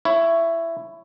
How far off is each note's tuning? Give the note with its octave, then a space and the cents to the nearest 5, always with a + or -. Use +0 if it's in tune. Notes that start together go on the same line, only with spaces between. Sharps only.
E4 +15 C#5 +0